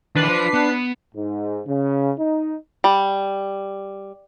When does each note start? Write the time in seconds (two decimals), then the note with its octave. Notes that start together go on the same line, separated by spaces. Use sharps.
0.15 D#3 E3 D4 B4 C7
0.28 F4 C5
0.54 B3
1.15 G#2
1.66 C#3
2.19 D#4
2.84 G3